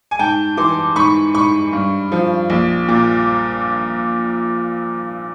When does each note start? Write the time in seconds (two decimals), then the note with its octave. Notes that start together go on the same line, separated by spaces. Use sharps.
0.11 G#5
0.19 G#2 G5 A5
0.57 E3 C6 D6
0.96 G#2 B5 C#6
1.34 G#2 B5 C#6
1.73 G2
2.12 F3
2.50 A#1
2.88 A#2